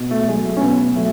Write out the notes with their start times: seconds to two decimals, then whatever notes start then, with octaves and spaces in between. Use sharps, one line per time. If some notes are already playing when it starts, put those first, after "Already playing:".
Already playing: B2
0.11 A3
0.28 F#3 G#3
0.45 A3
0.57 C#4
0.61 B2 B3
0.95 F#3 A3